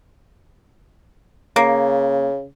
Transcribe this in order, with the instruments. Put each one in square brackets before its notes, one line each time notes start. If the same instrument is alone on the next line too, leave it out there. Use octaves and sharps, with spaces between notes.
[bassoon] C#3 [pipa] A#3